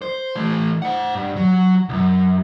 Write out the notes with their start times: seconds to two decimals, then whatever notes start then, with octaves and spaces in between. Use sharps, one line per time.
0.02 C5
0.36 E3 A3
0.82 C5 F#5
1.15 G2
1.36 F#3
1.89 C2 F#2